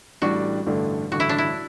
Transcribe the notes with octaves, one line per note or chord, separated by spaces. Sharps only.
A1 A2 G3 D4 F#4
A1 G2 D3 A3 D4
A1 G2 D3 F#4
E4
D4
E4